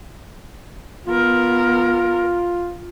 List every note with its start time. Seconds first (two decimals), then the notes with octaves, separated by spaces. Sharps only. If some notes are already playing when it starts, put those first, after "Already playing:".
1.07 B3 F4 A#4